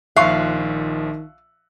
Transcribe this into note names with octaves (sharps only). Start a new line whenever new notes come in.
A#1 D#3 F3 E5 F5 C6 C#6 F#6